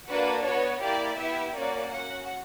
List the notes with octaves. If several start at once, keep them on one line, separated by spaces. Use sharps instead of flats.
A#3 D4 F#4 B4
B3 F#4 C#5
A#3 E4 G4 D5
B3 E4 G4 E5
A#3 C#4 F#4 D5
C#4 F#4 F#5